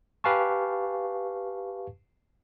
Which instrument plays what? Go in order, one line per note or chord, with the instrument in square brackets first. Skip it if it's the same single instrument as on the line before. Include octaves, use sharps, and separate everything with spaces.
[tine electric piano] G4 B4 F5 G#5 A5 C#6